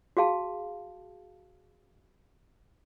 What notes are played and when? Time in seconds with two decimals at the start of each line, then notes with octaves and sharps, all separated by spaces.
0.17 F#4 G#4 F5 A5